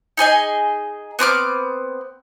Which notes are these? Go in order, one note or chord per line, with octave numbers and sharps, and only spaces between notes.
D#4 G#4 D#5 G#5
B3 C4 D6 F6